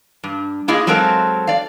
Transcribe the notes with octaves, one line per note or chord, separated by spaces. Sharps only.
G2
A#3 E4 F4 G#4 D#5
F#3 G#3 C4 A4 A#4 F5
D5 F5